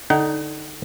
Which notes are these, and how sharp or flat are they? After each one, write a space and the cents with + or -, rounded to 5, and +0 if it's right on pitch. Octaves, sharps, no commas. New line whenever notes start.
D3 +0 D#4 +0 F#5 +40